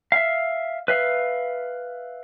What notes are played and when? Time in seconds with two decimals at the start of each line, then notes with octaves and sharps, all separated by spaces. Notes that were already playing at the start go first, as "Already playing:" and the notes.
0.12 E5 F5
0.88 B4 E5 F5